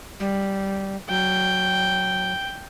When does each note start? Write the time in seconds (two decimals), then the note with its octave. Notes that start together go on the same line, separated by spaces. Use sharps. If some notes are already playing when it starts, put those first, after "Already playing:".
0.20 G3
1.09 F#3 G5